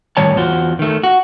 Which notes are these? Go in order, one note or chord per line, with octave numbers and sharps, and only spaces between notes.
A2 D#3 G3 C#5 A5
E2 F4 F#4 C5
D#3 A3
F#4